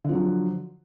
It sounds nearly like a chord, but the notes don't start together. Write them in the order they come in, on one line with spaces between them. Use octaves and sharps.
D3 F3 F#3